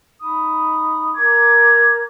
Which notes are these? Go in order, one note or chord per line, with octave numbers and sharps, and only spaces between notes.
D#4 B5 D#6
A#4 A#5 D6 G#6